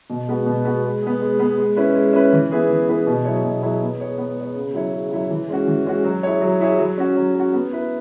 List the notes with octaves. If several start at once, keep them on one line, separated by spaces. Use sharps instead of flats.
B2
G#3 B3 F#4
B2
G#3 B3 F#4
G#3
B3 G#4
G#3
B3 G#4
G#3
C#4 E4 B4
G#3
C#4 E4 B4
E3
B3 E4 G#4 B4
E3
B3 E4 G#4 B4
B2
F#3 E4 G#4 C#5
B2
F#3 E4 G#4 C#5
B3
G#4 C#5
B3
G#4 C#5
C#3
F#3 E4 C#5
C#3
F#3 E4 C#5
E3
G#3 C#4 F#4
E3
G#3 C#4 F#4
F#3
E4 G#4 C#5
F#3
E4 G#4 C#5
F#3
C#4 F#4
F#3
C#4 F#4
B3
E4 B4